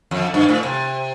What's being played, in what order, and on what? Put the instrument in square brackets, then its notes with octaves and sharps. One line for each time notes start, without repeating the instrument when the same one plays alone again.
[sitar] F2
G2
A2
C3